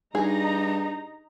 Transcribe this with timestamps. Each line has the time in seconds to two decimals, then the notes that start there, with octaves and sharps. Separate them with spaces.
0.15 G2 D#4 G#4 A#5